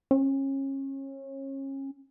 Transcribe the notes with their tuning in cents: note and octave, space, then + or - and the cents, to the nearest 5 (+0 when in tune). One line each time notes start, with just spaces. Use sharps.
C#4 -30